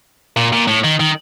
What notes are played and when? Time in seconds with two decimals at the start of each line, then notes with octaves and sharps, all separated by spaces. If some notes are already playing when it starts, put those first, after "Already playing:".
0.37 A#2
0.53 A#2
0.68 A2
0.84 D#3
0.99 D#3